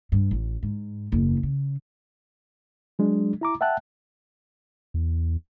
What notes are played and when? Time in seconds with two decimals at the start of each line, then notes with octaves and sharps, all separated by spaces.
0.12 G2
0.31 A1
0.63 G#2
1.12 F#1 E2
1.43 C#3
2.99 F#3 G#3 D4
3.41 E4 A#5 D6
3.61 E5 F#5 G5 A5 F#6
4.94 E2